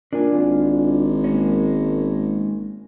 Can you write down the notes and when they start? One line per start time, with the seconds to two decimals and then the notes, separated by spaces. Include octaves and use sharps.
0.13 A#2 D4 F4 G#5
0.32 G#1
1.24 G#3 A#3 C#4